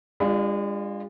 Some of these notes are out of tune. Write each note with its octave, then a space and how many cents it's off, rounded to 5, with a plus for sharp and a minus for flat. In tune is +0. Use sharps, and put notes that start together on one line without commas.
G#3 -40 D4 +0 F4 +0